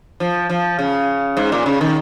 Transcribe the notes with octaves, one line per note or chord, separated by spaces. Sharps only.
F3
F3
C#3
G#2
A#2
C#3
D#3